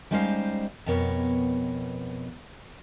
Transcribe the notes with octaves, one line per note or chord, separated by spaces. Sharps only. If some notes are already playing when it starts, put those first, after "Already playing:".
G3 G#3 C#4 D#4 C5 F5
F2 B2 B3 A#4 C#5